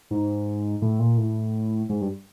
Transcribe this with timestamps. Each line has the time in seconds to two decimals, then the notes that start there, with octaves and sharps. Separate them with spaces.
0.11 G#2
0.82 A2
0.99 A#2
1.18 A2
1.89 G#2
2.01 G2